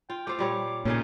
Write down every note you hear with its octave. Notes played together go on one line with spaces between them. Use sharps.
F4 G5
A3 C5 F5 D6
A#2 G3 C#5
A#2 C#3 A3 C#4 D#4